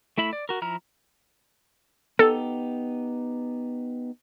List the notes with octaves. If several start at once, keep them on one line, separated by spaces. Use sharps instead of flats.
A3 E4 E5 B5
D5
F#4 A#4
F3 E4 A#5 F6
B3 D#4 G4 A4